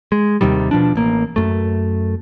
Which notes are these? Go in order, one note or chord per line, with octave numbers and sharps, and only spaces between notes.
G#3
D#2 C3 D#3 G3
B2 F3 D4
A1 A#3
F#2 A3